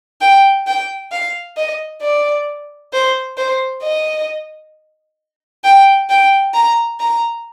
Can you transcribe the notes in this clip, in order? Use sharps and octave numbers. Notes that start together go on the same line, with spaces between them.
G5
G5
F5
D#5
D5
C5
C5
D#5
G5
G5
A#5
A#5